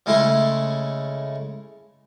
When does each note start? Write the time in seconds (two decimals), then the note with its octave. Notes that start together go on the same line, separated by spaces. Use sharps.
0.06 C#3 G#3 A3 E4 G#4 C6